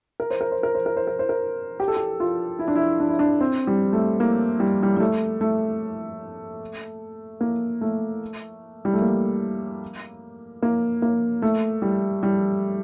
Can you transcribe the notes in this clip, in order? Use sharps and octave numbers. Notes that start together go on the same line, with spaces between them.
A#4
C5
A#4
C5
A#4
C5
A#4
C5
A#4
C5
A#4
G4
A4
G4
F4
E4
D4
E4
D4
E4
D4
C4
G3
A3
A#3
G3
G3
G3
A3
A3
A#3
A3
G3
A3
A#3
A#3
A#3
A3
G3
G3